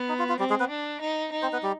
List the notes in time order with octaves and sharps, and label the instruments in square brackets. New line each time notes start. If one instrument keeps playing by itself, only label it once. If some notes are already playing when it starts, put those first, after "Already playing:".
Already playing: [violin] B3
[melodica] D#4
F4
F4
[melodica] G3 G4 [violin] C4
[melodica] G#3 G#4
B3 B4
[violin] D4
D#4
D#4
[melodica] C4 C5
B3 B4
G3 G4